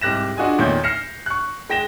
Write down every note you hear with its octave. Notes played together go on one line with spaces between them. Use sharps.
C2 G#2 G4 F#6 A#6 E7
D4 F4 F#4 G#4 D#5 G#5
E2 A#2 D#3 A3 C#5 G6
F6 A#6 C7 C#7 E7
C#6 F#6
G#3 G5 A#6 E7 G7